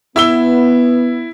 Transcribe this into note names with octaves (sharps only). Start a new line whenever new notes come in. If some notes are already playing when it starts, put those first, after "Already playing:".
B3 E4 E6 G7